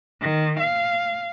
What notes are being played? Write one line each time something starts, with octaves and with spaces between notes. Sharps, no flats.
D#3
F5